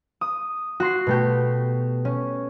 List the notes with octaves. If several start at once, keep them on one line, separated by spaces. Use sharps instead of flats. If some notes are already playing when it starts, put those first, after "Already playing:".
D#6
F#4 C6 C7
B2 A3 G4
C#4